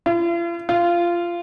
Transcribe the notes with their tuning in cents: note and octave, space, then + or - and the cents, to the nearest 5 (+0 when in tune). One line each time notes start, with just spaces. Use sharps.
F4 -45
F4 -15